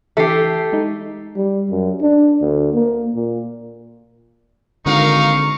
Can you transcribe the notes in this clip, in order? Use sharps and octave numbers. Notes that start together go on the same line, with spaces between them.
E3 A3 G4 B6 C7
G#3 D#4
G3
F#2
D4
D2
A#3
A#2
G#1 D3 D#4 A#4 F5 C#6